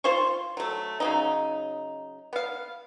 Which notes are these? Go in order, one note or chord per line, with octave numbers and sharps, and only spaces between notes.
F4 C5 C6 C#6
F#3 A3
C#3 F#3 D#4
B3 F5